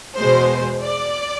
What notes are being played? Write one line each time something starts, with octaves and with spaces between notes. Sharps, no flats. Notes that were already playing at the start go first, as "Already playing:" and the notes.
E2 B2 G#3 C5
D5